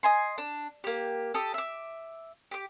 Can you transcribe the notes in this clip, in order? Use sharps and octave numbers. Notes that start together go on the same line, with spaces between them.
D#5 G#5 C6
D4
A#3 G4
G4 A4 D#6
E5 D6
G4 D6